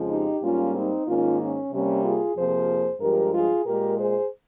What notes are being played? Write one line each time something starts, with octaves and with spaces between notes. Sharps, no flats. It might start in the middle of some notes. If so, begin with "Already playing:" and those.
Already playing: F2 C#3 F3 G#3
D#4 G4
G#2 G3 A#3 C#4 F4
C4 D#4
G#2 D#3 A#3 C#4 F4
C#4
C3 G3 A#3 C#4
F4 G#4
F2 C3 F3 A#3 G#4 C5
G2 F3 G#3 G4 A#4
F4 G#4
A#2 G#3 G4 A#4
G#4 C5